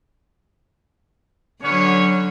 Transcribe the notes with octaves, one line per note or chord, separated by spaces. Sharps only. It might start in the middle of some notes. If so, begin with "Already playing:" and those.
D3 F#3 B3 C#4 C#5